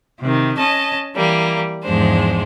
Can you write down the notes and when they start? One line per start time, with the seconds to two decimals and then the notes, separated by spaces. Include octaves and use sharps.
0.20 C3 D#3
0.57 C#4 D#5 A5
1.15 E3 G3 A#3
1.83 E2 G#2 F3 G#3 D4 C5